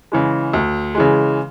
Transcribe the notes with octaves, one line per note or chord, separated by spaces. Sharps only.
C#3 E3 G#3
D2
C#3 E3 G#3